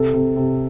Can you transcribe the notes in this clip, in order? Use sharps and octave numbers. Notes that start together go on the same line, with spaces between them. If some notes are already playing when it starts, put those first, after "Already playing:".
Already playing: C3 A4
C3
C3